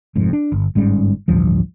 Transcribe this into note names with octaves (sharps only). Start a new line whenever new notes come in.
F1 F2 G#2
D4
G1
G1 G#2 G3 C#4
A1 D2 G2 F3